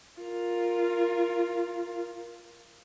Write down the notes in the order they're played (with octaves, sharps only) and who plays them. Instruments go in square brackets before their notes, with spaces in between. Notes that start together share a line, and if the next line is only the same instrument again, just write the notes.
[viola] F4 A#4